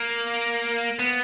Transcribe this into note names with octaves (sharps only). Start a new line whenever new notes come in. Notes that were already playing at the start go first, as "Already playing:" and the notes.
Already playing: A#3
B3